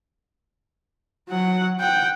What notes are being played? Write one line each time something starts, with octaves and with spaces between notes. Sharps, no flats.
F#3 F#5
F#5 G5